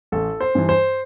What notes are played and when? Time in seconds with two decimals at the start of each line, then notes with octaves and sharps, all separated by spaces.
0.12 A1 A4
0.41 C5
0.55 G2 E3
0.69 C5